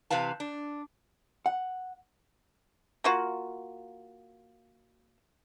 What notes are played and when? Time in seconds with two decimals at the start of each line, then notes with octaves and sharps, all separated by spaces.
0.10 C3 E3 B4 F5 A5
0.40 D4
1.46 F#5
3.04 A#3 F4 F#4